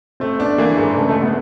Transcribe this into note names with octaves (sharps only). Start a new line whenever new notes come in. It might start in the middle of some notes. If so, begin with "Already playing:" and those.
A3 C4
B3 D4
E3 A#3
G#2 G#3
C#3 A3
A3
G1
B3